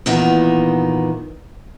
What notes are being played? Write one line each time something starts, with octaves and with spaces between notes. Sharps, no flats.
E2 A#2 D#3 B3 D#4